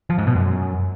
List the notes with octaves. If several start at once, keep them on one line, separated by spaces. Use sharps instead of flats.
F3
G#2
B2
F#2